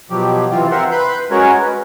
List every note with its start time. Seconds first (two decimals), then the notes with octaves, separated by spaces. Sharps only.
0.10 B2 F3 F#3 G4
0.51 C3 E3 C4 F4
0.71 C4 A#4 C5 E5 F#5 C6
0.91 B4 B5 C6 G6
1.31 G#3 C#4 F#4 A#4 C#5
1.60 B4